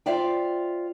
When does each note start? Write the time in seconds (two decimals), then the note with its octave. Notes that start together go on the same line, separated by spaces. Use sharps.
0.06 F4 C5 D5 E5 G5